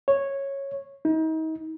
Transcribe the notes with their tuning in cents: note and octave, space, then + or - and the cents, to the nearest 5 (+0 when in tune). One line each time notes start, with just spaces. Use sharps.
C#5 -10
D#4 +35